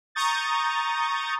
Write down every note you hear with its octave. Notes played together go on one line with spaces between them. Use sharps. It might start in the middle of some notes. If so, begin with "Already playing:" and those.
A#5 C#6 D#6 G6 A6